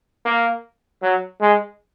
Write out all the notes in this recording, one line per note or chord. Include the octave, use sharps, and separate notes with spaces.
A#3
F#3
G#3